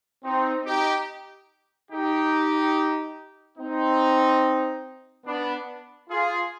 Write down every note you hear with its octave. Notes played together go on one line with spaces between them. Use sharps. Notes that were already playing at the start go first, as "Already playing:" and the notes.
C4 D#4
D#4 G4
D#4 G4
C4 D#4
B3 D4
F4 G#4